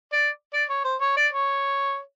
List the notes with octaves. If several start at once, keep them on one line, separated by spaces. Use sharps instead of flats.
D5
D5
C#5
C5
C#5
D5
C#5